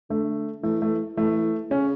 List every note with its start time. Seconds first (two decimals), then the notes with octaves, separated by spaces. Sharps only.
0.10 D3 A3
0.63 E3 A3
0.82 A3
1.17 E3 A3
1.71 C#3 C#4